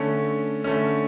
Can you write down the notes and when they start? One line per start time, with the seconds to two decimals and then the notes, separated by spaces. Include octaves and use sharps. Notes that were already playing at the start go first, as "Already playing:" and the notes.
Already playing: D3 A3 C#4
0.64 D3 A3 C#4